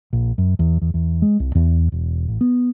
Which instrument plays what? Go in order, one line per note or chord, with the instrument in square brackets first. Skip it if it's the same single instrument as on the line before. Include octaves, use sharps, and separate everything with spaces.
[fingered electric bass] A#1
F#2
E2
E2
E2
G#3
C2
E2
E1
A1
B3